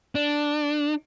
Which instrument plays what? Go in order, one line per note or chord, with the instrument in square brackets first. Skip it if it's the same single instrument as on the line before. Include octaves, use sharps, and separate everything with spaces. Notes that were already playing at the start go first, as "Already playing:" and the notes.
[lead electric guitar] D4